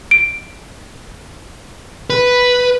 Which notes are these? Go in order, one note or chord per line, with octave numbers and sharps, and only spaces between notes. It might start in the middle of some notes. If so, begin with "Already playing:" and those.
D7
B4